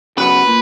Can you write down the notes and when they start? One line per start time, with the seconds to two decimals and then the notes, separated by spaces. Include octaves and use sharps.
0.18 C#3 F#3 B3 B4
0.47 A#2